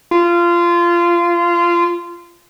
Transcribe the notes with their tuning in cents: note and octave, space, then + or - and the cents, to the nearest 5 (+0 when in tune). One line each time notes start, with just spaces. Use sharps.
F4 -20